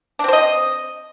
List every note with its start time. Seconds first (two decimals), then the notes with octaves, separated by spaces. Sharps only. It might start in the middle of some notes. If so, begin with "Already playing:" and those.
0.19 D4
0.24 C4
0.28 C5
0.33 D#5